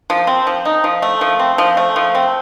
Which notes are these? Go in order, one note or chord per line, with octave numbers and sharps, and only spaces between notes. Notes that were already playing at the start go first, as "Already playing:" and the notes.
F3
C4
F3
D#4
F3
A3
F3
C4
F3
A3
F3
C4